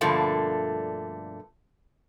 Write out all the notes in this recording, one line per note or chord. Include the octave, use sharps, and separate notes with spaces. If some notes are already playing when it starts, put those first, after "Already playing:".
G2 B2 D3 F3 A3 A#3